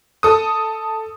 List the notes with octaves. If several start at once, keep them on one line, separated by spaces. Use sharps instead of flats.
A4 D#6